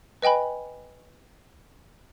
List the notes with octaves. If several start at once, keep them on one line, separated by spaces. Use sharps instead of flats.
B4 D#5 G5 G#5 B5